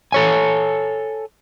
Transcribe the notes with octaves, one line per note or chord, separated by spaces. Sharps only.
A4 C#5 G#5